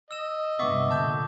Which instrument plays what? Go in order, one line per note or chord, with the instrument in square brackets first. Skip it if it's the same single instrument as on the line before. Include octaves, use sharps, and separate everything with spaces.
[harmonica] D#5 [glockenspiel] E6 E7
[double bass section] G2 C3 [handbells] B3 E5 C#6 [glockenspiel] D6
[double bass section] A#2 D3 A#3 [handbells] A5 G6